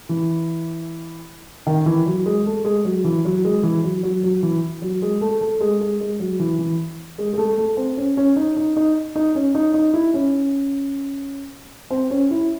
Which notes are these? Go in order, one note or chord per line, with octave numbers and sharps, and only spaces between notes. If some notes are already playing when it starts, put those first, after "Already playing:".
E3
D#3
E3
F#3
G#3
A3
G#3
F#3
E3
F#3
G#3
E3
F#3
F#3
F#3
E3
F#3
G#3
A3
A3
G#3
G#3
G#3
F#3
E3
E3
G#3
G#3
A3
A3
C4
C#4
C#4
D#4
D#4
D#4
D#4
C#4
D#4
D#4
E4
C#4
C4
C#4
E4